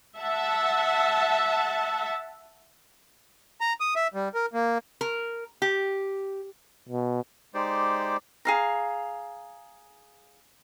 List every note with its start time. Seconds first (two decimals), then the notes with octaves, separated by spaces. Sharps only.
0.19 E5 F#5 A5
3.61 A#5
3.80 D#6
3.96 E5
4.14 G3
4.34 A#4
4.53 A#3
5.01 A#4
5.62 G4
6.89 B2
7.54 G#3 D#4 G4 C5 D5
8.45 G#4 F5 A#5